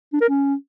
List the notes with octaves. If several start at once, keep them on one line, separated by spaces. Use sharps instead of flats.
D4
A#4
C#4